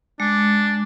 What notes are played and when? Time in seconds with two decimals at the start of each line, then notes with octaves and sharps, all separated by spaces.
0.20 G#3 D4